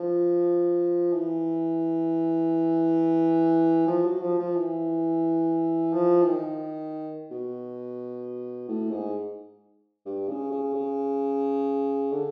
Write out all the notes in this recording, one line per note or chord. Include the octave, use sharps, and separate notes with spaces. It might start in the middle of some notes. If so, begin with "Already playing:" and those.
Already playing: F3
E3
F3
F#3
F3
F3
E3
F3
E3
D#3
B2
A2
G#2
G2
C#3
C#3
C#3
D3